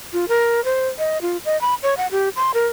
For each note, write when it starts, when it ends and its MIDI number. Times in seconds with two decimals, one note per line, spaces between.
0.13 0.25 65
0.28 0.63 70
0.65 0.88 72
0.99 1.21 75
1.22 1.37 65
1.45 1.59 75
1.61 1.74 83
1.83 1.97 73
1.97 2.07 78
2.12 2.29 67
2.36 2.51 84
2.54 2.67 70